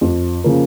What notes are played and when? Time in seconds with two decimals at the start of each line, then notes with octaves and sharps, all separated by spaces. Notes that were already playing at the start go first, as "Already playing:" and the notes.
0.01 F2
0.44 C#3 F3 A#3